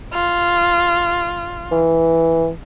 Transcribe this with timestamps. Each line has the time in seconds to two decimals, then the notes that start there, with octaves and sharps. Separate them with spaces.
0.13 F4
1.71 E3